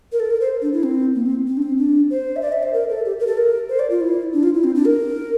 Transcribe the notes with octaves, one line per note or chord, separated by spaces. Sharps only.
A#4
A4
A#4
C5
D4
E4
C4
A#3
C4
C4
D4
C4
D4
C5
E5
D5
E5
C5
A#4
A4
G4
A#4
A4
A#4
C5
D5
F4
E4
D4
F4
E4
C4
D4
A#4